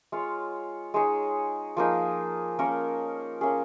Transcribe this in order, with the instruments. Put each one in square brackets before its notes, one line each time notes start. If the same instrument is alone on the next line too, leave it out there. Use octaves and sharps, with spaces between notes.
[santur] G#3 F4 C#5 F5
G#3 D#4 G#4 C#5
F3 A#3 D#4 G#4
A#3 C#4 A#4 C#5
A#3 C#4 G#4